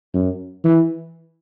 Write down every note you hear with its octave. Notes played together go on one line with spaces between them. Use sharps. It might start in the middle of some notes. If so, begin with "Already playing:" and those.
F#2
E3